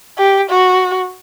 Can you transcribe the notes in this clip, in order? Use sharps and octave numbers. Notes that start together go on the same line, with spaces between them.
G4
F#4